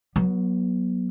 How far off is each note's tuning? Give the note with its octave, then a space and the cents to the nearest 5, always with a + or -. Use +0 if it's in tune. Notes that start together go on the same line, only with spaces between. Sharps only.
F#3 +0 B3 -35